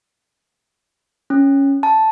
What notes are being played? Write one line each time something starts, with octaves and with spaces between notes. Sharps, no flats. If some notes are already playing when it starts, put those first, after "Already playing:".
C#4
A5